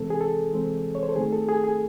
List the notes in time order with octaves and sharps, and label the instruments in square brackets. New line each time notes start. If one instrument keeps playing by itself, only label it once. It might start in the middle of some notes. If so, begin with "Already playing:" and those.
Already playing: [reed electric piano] C3 E3 G#3 C4 A4
G#4
A4
C3 E3 G#3 C4
C#5
C5
A4
D#3 A3 C4 G#4
A4
G#4
G#4